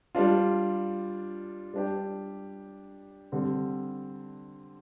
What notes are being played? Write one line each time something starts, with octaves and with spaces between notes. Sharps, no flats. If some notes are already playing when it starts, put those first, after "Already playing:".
G3 D4 F4
G3 D4 G4
D3 G3 C4